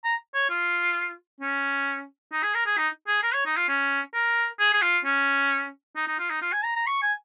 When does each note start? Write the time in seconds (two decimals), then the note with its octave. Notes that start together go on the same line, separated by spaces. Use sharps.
0.04 A#5
0.34 C#5
0.50 F4
1.41 C#4
2.32 D#4
2.43 G#4
2.54 A#4
2.66 G#4
2.78 D#4
3.08 G#4
3.23 A#4
3.34 C#5
3.46 D#4
3.57 F4
3.69 C#4
4.14 A#4
4.60 G#4
4.74 G#4
4.82 F4
5.05 C#4
5.96 D#4
6.07 D#4
6.19 F4
6.30 D#4
6.42 F4
6.53 G#5
6.64 A#5
6.76 A#5
6.87 C#6
7.02 G#5